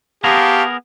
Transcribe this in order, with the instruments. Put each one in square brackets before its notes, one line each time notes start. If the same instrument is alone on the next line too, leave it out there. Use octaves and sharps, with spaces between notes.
[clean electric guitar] B3 G#4 A#4 [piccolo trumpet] G4 [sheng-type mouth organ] F5 A5 C#6